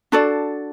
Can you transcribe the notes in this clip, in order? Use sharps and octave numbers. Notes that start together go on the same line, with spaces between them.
D4 F#4 A4 D5